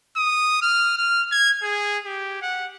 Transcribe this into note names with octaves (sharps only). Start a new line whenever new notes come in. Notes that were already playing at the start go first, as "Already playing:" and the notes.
D#6
F6
F6
G#6
G#4
G4
F#5